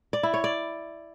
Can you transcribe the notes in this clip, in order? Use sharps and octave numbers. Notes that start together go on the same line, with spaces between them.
D5
E4
C#5
D5